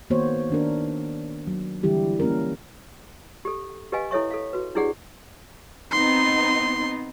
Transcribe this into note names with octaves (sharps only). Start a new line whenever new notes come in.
D#3 A#3 B3 F#4 C5 C#5
D#3 D4 A#4
F#3
D3 E3 G3 E4 G4
A#3 C#4 A#4
G4 A4
G4 B4 D#5 F5 G#5
E4 A4 C#5 E5 C#6
A4 F5
F#4 B4
D4 E4 G4 G#4 D5 F#5
B3 C4 D#4 C6